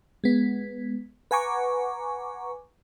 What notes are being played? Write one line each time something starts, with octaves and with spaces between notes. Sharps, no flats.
G#3 B3
B4 F#5 G#5 A#5 C#6 D6